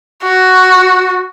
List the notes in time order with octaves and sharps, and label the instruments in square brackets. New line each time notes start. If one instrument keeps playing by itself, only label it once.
[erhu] F#4